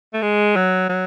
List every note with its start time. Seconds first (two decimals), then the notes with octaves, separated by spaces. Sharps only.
0.14 A3
0.22 G#3
0.56 F#3
0.89 F#3